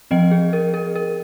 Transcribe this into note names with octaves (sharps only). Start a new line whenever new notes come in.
F3 C4 D#5 G5
G#4
A#4
A#4
A#4